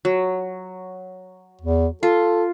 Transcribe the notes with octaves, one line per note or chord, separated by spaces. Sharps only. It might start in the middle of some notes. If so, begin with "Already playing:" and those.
F#3
E2
F4 A4